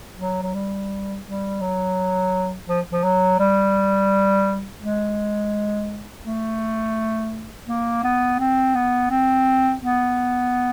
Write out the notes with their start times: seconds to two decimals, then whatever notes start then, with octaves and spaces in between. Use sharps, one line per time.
0.18 F#3
0.42 F#3
0.54 G3
1.25 G3
1.61 F#3
2.68 F3
2.91 F3
3.04 F#3
3.39 G3
4.82 G#3
6.25 A3
7.68 A#3
8.03 B3
8.39 C4
8.75 B3
9.10 C4
9.82 B3